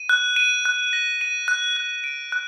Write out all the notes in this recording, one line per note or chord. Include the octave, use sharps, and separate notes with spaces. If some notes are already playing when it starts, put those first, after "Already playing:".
Already playing: D#7
F#6
D#7
F#6
A#6
D#7
F#6
F#6
D7
F#6